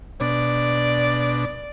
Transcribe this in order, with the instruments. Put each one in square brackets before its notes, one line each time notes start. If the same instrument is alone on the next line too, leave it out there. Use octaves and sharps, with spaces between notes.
[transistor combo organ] B2 D4 [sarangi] D5